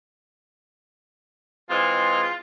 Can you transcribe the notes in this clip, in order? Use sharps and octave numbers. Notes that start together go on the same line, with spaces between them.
E3 G#3 C4 F4